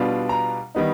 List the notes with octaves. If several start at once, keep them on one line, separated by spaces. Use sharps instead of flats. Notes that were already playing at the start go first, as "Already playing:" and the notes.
Already playing: B2 G3 B3 D4 F4
A#5
D#3 G3 B3 D#4